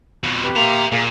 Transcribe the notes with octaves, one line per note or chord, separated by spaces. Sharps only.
F2 B2
G4 B4
A#3 G4 E5 A#5 C6
A#2 A#3 G#4